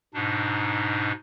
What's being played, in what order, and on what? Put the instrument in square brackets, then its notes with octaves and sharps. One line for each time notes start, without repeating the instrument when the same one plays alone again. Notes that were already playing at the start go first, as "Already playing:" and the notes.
[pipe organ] G#2 B2 D4 D#4